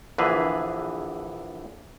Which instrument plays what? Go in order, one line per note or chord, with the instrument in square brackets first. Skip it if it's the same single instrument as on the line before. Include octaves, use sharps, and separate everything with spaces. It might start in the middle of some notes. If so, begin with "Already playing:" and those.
[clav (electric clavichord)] A#1 D3 E3 G#4 B4